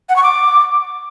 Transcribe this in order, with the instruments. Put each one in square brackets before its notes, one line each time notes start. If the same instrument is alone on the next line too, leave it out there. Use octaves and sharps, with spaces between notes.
[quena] F#5
C#6
D6